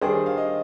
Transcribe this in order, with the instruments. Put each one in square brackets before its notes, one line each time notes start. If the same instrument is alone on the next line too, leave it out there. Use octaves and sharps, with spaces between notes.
[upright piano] D#3 G3 D4 G#4 D5 [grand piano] C5
[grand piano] F5
D#5